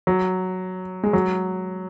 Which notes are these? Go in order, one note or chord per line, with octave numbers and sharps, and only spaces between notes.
F#3
G#3
F#3